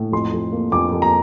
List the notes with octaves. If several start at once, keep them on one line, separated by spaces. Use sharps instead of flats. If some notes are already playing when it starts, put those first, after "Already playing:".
Already playing: A2
F2 C6
F2
A#3
F2 D6
F2
A#5